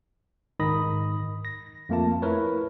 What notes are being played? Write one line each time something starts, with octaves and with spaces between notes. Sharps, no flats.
G#2 D#3 D#4 B5 D#6 A#6
A#6
F2 A3 A#3 F4 A5
E4 A#4 B4 C#5